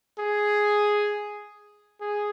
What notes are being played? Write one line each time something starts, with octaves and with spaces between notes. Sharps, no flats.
G#4
G#4